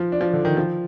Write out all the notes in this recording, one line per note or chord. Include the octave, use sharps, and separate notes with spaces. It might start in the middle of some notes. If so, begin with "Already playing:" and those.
Already playing: F3
D4
F3
D3
D#3
F3